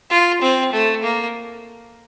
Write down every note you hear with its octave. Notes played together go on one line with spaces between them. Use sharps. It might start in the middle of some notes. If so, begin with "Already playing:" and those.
F4
C4
A3
A#3